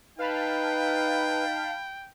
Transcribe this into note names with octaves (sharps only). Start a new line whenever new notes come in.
D#4 B4 F5 G5 A5 B5